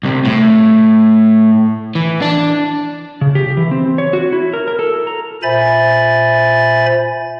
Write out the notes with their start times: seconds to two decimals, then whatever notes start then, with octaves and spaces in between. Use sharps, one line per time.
0.03 C2 C3
0.25 A2
1.95 E3
2.22 D4
3.21 C#3
3.35 G4
3.57 E3
3.71 C4
3.98 C#5
4.13 F#4
4.32 E4
4.54 A#4
4.68 A#4
4.79 A4
5.07 A#5
5.43 A#2 C5 E5 G#5 B5 A6